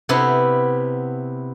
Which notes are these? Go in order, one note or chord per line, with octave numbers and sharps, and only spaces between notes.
C3 B3 E4